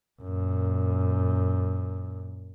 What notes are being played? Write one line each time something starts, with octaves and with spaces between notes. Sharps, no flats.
F#2 A#2